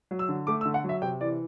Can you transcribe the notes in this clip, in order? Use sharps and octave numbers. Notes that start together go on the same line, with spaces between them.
F#3
E6
D3
A3 D6
E6
D3
F#5
F#3
E5
C3 G5
E3 D5